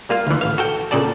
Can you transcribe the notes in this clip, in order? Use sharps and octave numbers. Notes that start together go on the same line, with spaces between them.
G3 A#3 F4 F5
D2 E3
A1 F5
F#4 A4 G5
A#2 C#3 A4 D5 A5